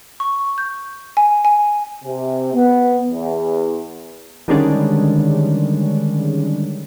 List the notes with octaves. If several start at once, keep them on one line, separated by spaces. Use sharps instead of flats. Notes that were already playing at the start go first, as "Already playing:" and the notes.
C#6
G6
G#5
G#5
C3
B3
E2
D3 D#3 G3 G#3 C#4 D4